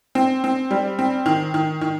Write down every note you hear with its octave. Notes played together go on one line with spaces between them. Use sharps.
C4
C4
G3
C4
D#3
D#3
D#3